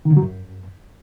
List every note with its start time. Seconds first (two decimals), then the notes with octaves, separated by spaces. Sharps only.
0.05 D#3
0.11 D3
0.17 F#3
0.22 F#2